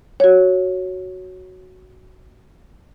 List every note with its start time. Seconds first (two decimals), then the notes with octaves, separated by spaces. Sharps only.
0.20 F#4 C#5